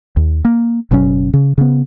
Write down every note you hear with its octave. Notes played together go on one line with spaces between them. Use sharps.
D#2
A#3
F#1 B2 F#3 C#4
C#3
C#3 B3